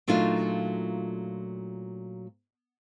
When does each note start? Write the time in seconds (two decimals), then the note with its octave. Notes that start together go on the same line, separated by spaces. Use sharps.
0.07 A#2 F#3 A3 D4 D#4 F4